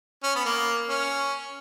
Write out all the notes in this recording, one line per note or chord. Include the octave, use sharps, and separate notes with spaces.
C#4
B3
A#3
C#4